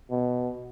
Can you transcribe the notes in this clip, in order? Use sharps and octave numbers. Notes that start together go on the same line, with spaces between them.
B2